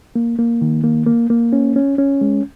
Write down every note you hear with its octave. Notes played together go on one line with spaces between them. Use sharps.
A#3
A#3
D#3
A#3
A#3
A#3
C#4
C#4
C#4
G#3